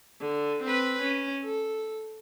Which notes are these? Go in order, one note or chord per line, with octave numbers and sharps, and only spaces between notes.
D3
C4 B4
C#4
A4